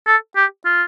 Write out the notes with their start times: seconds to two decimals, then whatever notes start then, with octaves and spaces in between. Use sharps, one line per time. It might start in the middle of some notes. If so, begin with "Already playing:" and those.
0.07 A4
0.36 G4
0.65 F4